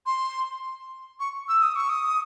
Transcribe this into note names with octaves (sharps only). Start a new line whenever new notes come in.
C6
C#6
E6
D#6
C#6
D#6